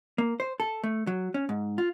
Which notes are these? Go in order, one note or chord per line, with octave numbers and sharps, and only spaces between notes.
A#3
C5
A4
A3
F#3
C#4
G#2
F4